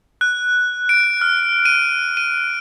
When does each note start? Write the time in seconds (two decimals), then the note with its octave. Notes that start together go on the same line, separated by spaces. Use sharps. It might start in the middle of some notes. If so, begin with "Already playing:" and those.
0.21 F#6
0.89 D7
1.21 F6
1.65 D#7
2.17 D#7